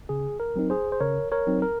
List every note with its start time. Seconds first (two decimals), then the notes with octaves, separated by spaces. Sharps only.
0.09 C#3 G#4
0.40 A#4
0.56 F#3 C4 D#4
0.70 G#4 C5
0.92 C5
1.00 C#3 A#4 C#5
1.32 A#4 C#5
1.47 F#3 C4 D#4
1.62 A#4